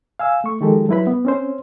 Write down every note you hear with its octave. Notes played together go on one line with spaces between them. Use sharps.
F5 G#5 E6
A3 C#6
D#3 F3 G#3 G4 A4
F#3 G3 E4 B4 B5
B3
C4 C#4 C5